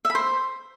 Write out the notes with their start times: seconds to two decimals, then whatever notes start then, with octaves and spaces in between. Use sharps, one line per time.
0.05 E5
0.10 B5
0.15 C5